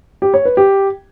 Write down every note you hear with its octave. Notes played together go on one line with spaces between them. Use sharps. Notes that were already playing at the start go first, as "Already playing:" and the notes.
G4
C#5
B4
G4